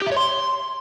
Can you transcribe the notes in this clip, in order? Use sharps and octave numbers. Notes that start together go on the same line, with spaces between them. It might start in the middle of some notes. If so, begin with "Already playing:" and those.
G4
E5
C#5
C6